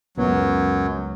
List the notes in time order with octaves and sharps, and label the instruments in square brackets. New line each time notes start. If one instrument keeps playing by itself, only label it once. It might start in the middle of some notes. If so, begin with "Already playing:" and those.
[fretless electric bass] C#2 B3 C#4 [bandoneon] F#2 F#3